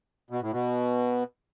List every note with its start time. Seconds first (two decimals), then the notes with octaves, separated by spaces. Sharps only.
0.30 B2
0.41 A2
0.52 B2